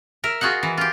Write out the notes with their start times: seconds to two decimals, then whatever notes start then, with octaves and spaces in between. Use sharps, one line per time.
0.24 A#4 E5
0.41 F4 F#4 G#4 D#5 F#5
0.63 E3
0.78 F4 G4